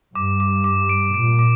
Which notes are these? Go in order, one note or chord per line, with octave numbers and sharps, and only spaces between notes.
G2 D6
D6
D6
D7
A#2 D7
D6